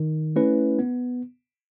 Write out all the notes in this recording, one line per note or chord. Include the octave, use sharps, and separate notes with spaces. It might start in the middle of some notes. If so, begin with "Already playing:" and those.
Already playing: D#3
A3 C#4 E4 B4
B3